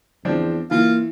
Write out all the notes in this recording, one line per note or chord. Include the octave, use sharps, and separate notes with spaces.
E2 F3 C4 D4
E3 A#3 F4